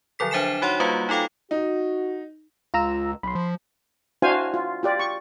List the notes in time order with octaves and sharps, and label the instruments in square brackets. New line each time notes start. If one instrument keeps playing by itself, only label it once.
[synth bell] D3 F3 F#3 A4 B6
D4 C5 E5 G#5 C7 E7
D#4 F#4 C#5 F#5 C6
G3 A#3 F4 F#4 B4 F5
D#4 F4 A4 F5 G5
[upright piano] D#4 [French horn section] F#4
[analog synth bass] C#2 [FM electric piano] F4 A#5 E6
[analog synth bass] B1 [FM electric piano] B5 C6
[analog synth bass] F3
[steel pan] D4 E4 F#4 C5 F5 G#5
F4
F4 G4 D5
C#6